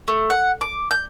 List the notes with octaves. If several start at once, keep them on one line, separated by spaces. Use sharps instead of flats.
A3
F#5
D6
G6